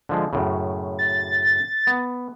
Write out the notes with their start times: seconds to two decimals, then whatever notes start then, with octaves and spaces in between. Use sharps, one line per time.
0.09 D3 F3 G#3
0.33 F#2 A2 C#3
0.99 A6
1.87 B3